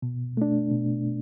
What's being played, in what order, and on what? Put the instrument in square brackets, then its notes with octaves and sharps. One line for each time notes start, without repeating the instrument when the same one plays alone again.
[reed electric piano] B2
A3 D4
B2